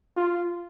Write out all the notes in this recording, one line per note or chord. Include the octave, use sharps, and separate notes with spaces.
F4